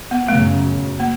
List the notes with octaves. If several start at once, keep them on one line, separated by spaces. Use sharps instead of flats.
B3
F#2 C#3 F#3 A3
A#3